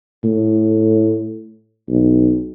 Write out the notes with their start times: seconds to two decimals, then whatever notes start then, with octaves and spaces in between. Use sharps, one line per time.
0.24 A2
1.89 B1